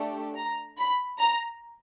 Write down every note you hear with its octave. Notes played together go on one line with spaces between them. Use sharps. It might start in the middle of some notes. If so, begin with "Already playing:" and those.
Already playing: A3 D4 G4
A#5
B5
A#5